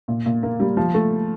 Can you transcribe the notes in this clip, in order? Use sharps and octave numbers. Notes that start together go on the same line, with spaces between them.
A#2
A#2
A#3
G3
F3
A3